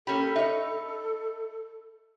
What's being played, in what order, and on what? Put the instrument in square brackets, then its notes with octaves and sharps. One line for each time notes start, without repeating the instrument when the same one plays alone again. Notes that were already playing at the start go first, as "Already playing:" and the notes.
[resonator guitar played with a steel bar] A#3 C#4 G4 [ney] A4 [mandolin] B5
[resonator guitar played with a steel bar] D#4 C#5 [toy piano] E5